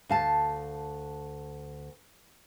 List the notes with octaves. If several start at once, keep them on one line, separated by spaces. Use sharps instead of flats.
D2 F5 A5